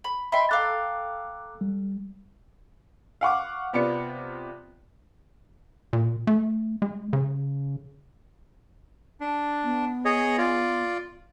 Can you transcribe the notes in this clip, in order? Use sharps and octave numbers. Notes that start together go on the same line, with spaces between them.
B5
D#5 E5 G5 B5 C6
A4 F5 G5 A#5 D6 F#6
G3
F5 F#5 C#6 D6
C3 B3 F4 D5 C#7
A#2
A3
G#3
C#3
D4
B3
G#4 C#5 D#5
F4 D5